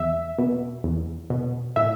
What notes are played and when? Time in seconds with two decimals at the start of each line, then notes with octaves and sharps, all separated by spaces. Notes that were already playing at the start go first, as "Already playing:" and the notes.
Already playing: E2 E5
0.38 B2
0.84 E2
1.30 B2
1.76 A2 E5